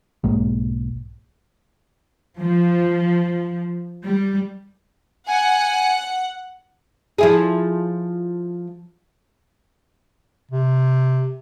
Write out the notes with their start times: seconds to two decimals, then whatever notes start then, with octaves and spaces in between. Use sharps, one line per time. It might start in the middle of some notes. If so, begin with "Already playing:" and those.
0.24 B1 G#2 G#3 A#3
2.39 F3
4.04 G3
5.27 F#5 G#5
7.18 F3 E4 G#4
10.51 C3